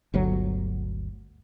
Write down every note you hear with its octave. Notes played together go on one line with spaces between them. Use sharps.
G1 D2 F#3